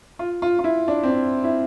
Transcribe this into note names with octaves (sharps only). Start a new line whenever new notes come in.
F4
F4
F4
E4
D4
C4
D4
E4